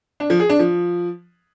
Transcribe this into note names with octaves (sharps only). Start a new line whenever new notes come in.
D4
F3
G#4
D4
F3